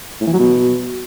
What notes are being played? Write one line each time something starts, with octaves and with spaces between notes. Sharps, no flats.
A2
E3
F#3
B2